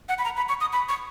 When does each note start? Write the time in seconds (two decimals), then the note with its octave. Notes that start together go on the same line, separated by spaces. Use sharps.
0.09 F#5
0.18 B5
0.25 A#5
0.37 B5
0.49 C#6
0.61 D#6
0.73 B5
0.89 C#6